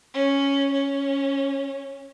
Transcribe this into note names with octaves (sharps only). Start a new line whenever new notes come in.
C#4
C#4